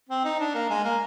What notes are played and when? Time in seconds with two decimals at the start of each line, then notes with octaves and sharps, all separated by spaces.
0.10 C4
0.24 D#4
0.40 D4
0.55 A#3
0.70 G#3
0.84 A#3